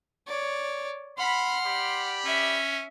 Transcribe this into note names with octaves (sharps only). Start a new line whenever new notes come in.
C#5 D5
F#5 B5 C6 F6
G4 D5 B5
C#4 E5